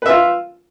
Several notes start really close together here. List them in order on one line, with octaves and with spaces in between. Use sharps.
B4 E5 F4